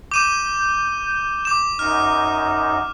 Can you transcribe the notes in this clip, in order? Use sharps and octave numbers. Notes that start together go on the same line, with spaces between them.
D6 G6 D#7 E7
D6 E7
F#2 D#4 F6